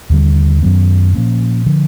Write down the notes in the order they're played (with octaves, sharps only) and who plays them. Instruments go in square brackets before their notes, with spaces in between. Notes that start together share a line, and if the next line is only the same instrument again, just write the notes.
[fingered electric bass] D#2 D3 G3
F#2 D#3 F#3 B3
A#2 F3 A#3 C#4
D3 F3